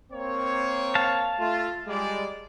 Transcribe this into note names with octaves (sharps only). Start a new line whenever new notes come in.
A#3 C4 C#5
F5 A5
A3 F4
G3 G#3 D5